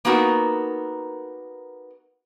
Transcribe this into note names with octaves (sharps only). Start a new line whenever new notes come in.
A#3 B3 D#4 F#4 A#4